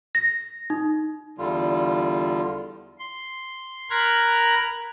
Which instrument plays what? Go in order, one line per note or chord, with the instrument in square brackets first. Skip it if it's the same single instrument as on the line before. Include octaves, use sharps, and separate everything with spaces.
[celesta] A#6
D#4
[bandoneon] E2 D3 G3 F4
[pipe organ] C6
A#4 A#5 B5 F6 F#6 G#6